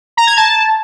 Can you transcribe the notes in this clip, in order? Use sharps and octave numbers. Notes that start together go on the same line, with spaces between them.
A#5
G#6
A5